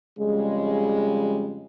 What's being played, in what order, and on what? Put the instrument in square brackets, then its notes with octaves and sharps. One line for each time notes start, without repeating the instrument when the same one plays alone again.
[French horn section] F2 C#3 G3 G#3